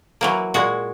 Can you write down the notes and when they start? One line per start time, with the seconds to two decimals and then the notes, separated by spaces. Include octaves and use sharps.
0.21 E3 F#3 A#3
0.54 A#2 G#3 F#4